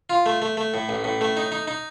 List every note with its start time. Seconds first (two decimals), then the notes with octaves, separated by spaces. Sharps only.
0.10 F4
0.26 A3
0.42 A3
0.57 A3
0.74 A2
0.89 A1
1.04 A2
1.21 A3
1.37 D#4
1.52 D#4
1.68 D#4